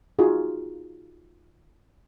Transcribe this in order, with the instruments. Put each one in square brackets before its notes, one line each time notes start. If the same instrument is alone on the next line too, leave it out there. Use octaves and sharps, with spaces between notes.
[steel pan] D#4 F4 F#4 G#4